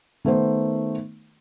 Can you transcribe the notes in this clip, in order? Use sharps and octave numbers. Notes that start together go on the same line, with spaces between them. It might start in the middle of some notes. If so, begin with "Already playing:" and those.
D#3 A3 B3 C5